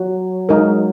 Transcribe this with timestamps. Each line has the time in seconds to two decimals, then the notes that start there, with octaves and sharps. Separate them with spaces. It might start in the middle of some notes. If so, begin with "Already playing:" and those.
Already playing: F#3 F#4
0.49 G#3 D#4 A#4